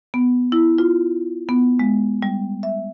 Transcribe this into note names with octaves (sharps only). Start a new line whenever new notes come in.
B3
E4
F4
B3
G#3
G3
E5